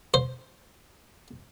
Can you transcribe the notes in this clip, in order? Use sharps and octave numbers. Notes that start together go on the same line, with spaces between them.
C5